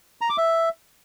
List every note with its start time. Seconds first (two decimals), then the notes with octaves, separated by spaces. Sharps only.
0.21 A#5
0.29 D6
0.38 E5